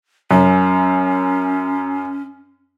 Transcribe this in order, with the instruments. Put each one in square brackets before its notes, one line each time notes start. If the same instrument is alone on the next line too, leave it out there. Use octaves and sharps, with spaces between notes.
[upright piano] F#2 [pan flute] C#4